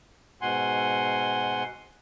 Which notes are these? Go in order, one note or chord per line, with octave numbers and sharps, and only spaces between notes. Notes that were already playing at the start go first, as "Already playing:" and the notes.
G#2 B2 F#5 G#5 C6